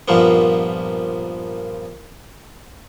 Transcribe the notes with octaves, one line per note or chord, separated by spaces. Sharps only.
G2 A#2 F3 A#3 B3